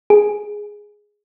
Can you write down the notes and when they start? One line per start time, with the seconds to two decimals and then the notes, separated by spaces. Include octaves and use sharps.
0.10 G#4